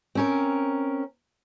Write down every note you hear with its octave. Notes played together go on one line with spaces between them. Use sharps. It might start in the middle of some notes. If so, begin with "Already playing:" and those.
C4 C#4 A#4